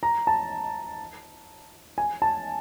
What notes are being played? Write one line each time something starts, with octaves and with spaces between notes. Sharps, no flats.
A#5
A5
G#5
A5